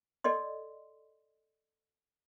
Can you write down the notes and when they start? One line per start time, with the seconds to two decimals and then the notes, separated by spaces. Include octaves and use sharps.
0.24 A4 D5 D#5 C6